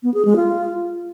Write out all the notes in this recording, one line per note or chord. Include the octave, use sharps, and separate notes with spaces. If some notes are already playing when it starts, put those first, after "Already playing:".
B3
G#4
G#3
F4